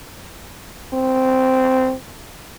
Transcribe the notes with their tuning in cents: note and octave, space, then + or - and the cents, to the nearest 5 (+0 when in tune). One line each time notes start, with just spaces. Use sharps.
C4 -10